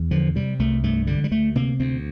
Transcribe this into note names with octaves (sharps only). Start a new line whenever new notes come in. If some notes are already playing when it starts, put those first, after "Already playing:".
Already playing: E2
D3 F3
C3 G3
C2 A3
G2 A3
D3 G3
G3
D2 A3
C3 A#3
D2 C4